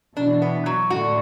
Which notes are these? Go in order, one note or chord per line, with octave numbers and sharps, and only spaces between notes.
B2 E3 D4
B3
F#3
A2 D3 F#4